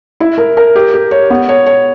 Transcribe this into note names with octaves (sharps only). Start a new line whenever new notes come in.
E4
A#4
A#4
G4
G4
C#5
B3
C#5
C#5